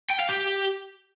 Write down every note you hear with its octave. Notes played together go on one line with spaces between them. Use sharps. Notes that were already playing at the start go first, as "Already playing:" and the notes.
G5
F5
G4